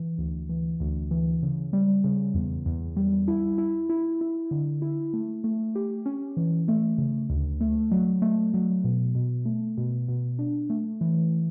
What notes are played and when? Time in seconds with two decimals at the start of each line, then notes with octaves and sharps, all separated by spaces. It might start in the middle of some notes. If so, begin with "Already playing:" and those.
Already playing: E3
0.18 D2
0.49 E3
0.80 D2
1.11 E3
1.43 C#3
1.73 G3
2.04 C#3
2.34 E2
2.66 E2
2.96 G3
3.28 E4
3.58 E4
3.90 E4
4.21 E4
4.51 D3
4.82 E4
5.13 A3
5.44 A3
5.75 G4
6.06 C#4
6.37 E3
6.68 A3
6.98 C#3
7.30 D2
7.61 A3
7.91 F#3
8.22 A3
8.54 F#3
8.84 B2
9.15 B2
9.46 A3
9.77 B2
10.08 B2
10.39 D4
10.70 A3
11.01 E3